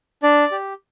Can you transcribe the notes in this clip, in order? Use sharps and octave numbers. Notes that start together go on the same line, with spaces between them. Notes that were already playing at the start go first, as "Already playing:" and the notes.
D4 D5
G4